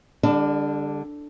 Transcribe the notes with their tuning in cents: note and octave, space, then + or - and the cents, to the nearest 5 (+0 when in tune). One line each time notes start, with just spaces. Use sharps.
D3 +0 G3 +40 D4 +0